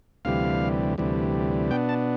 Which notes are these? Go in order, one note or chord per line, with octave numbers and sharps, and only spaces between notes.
D2 C3 E3 G3 F5
D2 C3 E3 G3
B2 B3 D4 G5
A5